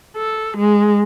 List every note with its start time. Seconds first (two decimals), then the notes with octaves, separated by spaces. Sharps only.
0.17 A4
0.58 G#3